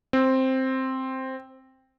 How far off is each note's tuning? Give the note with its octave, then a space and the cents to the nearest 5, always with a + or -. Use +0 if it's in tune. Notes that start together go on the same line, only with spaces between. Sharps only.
C4 +5